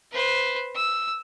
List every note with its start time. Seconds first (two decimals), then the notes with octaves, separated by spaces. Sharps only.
0.12 B4 C5
0.76 E6